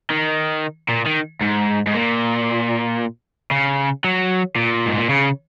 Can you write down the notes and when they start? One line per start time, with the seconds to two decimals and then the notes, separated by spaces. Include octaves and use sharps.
0.10 D#3
0.89 A#2
1.07 D#3
1.42 G#2
1.87 G#2
1.94 A#2
3.51 C#3
4.04 F#3
4.56 A#2
4.86 G#2
4.97 A#2
5.09 C#3